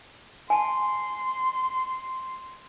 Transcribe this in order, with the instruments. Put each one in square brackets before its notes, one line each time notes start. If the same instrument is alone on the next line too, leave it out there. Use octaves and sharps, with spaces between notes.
[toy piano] G#5 A5 [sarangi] C6